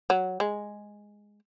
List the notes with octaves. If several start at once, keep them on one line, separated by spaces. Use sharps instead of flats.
F#3
G#3